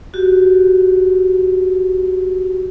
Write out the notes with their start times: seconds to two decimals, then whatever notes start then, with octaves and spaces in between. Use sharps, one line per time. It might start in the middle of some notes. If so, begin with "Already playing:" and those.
0.14 F#4 G4